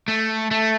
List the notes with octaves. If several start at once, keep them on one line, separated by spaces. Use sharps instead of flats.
A3
A3